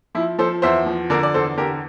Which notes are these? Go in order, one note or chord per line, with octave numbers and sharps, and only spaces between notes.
F3 E4
F3 A4 C5
E2 C5 E5
F3
D3 A#4 D5
D5
E2 A4 C5
D3 G4 A#4